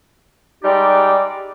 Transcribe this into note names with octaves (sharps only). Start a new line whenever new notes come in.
G3 G#3 D#4 G4 D5